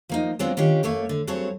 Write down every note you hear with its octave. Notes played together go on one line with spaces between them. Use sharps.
F3 A#3 D#4
F#3 G#3 B3 C4 D4 F4
D#3 C#4 D4 F4 G4
F#2 A3 A#3 C#5
D3
G2 F#3 C4 G#4 C#5 A5